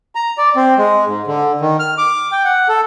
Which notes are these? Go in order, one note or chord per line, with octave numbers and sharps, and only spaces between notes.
A#5
D5
C4
G#3
G#2
D3
D#3
F6
D6
G5
F#5
A4